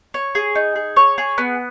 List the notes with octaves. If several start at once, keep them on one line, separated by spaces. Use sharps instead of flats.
C#5
G#4
D#4
G#4
C#5
G#4
B3